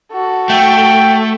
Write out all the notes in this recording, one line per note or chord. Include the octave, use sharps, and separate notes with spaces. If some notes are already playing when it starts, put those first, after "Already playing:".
F#4 A4
A3 G5